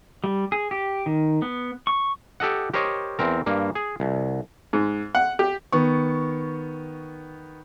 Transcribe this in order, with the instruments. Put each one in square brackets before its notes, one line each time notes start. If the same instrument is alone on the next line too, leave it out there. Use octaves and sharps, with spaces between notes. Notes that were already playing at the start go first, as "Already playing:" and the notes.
[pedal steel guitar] G3
G#4
G4
D#3
B3
C#6
[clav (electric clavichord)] G4 A4 D#5 F#5
G4 A#4 C5 C#5 D#5
E2 C4 A#4
G2 A#3
G#4
C2
[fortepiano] G#2
F#5
G4
[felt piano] D#3 B3 C#6